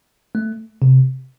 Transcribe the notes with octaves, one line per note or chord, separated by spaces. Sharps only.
A3
C3